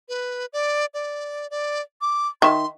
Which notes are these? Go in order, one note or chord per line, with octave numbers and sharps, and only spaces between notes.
B4
D5
D5
D5
D6
D#3 E5 C6